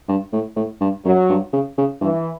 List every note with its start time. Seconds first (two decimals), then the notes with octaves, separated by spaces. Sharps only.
0.09 G2
0.33 A2
0.56 A2
0.81 G2
1.05 F#2 F#3
1.30 G2
1.53 C#3
1.78 C#3
2.01 G2 E3